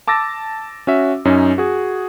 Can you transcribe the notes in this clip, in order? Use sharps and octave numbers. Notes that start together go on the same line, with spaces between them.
A5 D6 E6 A6 A#6
C#4 F#4 E5
F#2 C#4 D#4
F#4 G#4